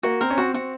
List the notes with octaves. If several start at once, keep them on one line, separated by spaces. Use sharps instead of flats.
A#3 F#4
C4 A#4
C#4
C4 F#4
C4 F#4